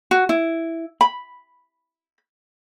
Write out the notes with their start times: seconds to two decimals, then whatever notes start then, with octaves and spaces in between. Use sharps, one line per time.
0.11 F#4
0.29 E4
1.01 B5